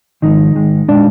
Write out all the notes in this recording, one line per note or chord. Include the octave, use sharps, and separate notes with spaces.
G#2 D#3 F3 G#3 D#4
G#2 D#3 G#3
A#2 G#3 D4 D5